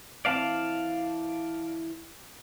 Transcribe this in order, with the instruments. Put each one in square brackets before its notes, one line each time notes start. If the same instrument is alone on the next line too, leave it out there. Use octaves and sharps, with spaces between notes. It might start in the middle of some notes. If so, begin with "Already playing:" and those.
[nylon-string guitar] E3 C4 [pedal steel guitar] D5 F5 A5